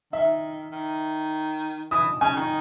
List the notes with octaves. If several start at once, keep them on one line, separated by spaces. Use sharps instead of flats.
D#3 E5
D#3
E3 D#6
C#3 G#5
D#3